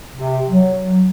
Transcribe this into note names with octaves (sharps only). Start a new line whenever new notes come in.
C3
F#3